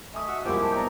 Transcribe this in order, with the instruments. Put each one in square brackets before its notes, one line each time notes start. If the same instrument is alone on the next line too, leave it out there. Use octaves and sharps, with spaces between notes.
[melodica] A3 [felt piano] D#5 G#5 D#6 [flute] E5
[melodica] F#4 C#6 E6
[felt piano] C2 A#3 A#4 [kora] F3 G#3 E4 [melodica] G4 G5
[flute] A5
[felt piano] B3 [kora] D#4 [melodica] D5 [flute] A#5